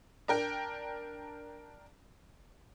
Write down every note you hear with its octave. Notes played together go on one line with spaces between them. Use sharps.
D4 A#4 G5